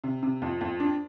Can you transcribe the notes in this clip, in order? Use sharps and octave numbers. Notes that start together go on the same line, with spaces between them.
C3
C3
F2
F2
D4